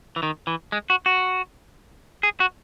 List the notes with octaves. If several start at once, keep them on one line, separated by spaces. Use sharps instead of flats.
E3
D#3
E3
G#3
F#4
F#4
G#4
F#4